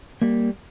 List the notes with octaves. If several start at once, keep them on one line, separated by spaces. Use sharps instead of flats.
G3 A#3